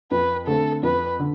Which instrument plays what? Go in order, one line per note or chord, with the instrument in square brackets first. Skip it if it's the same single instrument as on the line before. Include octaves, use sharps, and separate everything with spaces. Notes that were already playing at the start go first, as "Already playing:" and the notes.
[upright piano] F2 [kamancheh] B4
[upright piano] D3 A3 C4 [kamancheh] A4
[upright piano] F2 [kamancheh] B4
[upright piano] D3